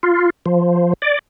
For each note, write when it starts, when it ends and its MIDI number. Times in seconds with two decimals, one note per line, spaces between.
0.03 0.30 65
0.46 0.93 53
1.02 1.19 74